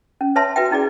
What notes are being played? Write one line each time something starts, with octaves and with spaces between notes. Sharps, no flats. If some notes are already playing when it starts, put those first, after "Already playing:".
C#4
B4 C#5 E5 A5 C6
F#4 B4 E5 G5
C#4 E4 G#4 D5